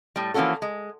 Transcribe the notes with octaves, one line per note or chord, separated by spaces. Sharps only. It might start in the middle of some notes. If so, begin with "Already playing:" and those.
A2 G3
E3 F3 A#3 C#4 F#4 A4
G#3